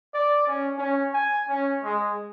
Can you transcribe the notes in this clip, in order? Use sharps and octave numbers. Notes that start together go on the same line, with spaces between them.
D5
C#4
C#4
G#5
C#4
G#3